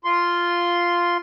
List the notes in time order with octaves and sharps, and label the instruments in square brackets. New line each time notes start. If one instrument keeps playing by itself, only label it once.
[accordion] F4 C6